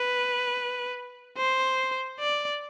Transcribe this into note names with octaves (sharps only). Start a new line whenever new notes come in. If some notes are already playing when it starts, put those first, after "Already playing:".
Already playing: B4
C5
D5